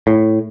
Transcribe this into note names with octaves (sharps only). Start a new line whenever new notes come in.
A2